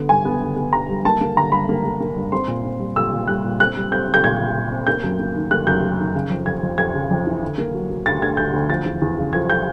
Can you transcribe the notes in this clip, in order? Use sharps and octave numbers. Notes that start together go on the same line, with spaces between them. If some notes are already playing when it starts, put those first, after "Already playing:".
Already playing: D3 B3
G2 G#5
B3
D3
B3
D3 A#5
G3
A#3 A5
A#3
D3 A#5
G2 B5
A#3
A#3
A#3
G2
C4 C6
A#2
C4
G3
A#2 E6
A#2
G3 F#6
A#2
C4 F#6
G3
C4 G6
C4
G6
A#2 G#6
A#2
A#2
C4
A#3 G6
F#2
A#3
D#3
A#3 F#6
F#2 G6
F#3
D#3
C#3
F2
F2 G#6
F2
F2 G#6
C#3
F2
E3
D3
A#3
F#3
F#3
D2 A6
D2 G#6
D3 G6
D2
F3 A6
E2
E2
C#3
F3 G#6
G6